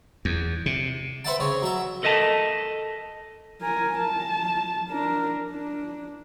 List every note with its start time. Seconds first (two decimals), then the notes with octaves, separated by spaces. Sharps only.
0.25 E2
0.66 C3
1.25 B4 C5 E5 F#5 G5 A5
1.40 C#3 C4 C#5
1.62 F#3 E5
2.03 A4 A#4 D#5 E5 A5
3.62 A#4 G#5
3.99 A5
4.90 D4 A#4
5.52 D4